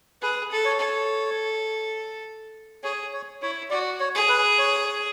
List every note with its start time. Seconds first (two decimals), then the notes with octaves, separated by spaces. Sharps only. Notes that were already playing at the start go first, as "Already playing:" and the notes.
0.22 G#4 B4
0.51 A4
0.65 C#5
0.80 A4
2.84 G#4 C#5
3.13 C#5
3.42 E4 C#5
3.70 F#4 D5
4.00 C#5
4.15 G#4
4.29 B4
4.58 C#5